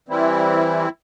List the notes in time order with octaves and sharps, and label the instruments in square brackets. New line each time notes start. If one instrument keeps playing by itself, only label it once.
[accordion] E3 G3 C4 E4